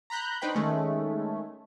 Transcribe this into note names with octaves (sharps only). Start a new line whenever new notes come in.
A#5 B5 F#6 G6
D4 D#4 B4 C5 G5 B5
D#3 G#3 A3 C#4